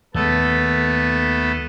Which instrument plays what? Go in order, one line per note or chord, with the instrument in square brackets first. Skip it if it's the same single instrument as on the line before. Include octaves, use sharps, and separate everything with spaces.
[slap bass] D#2 G#3 [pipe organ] A3 B3 A4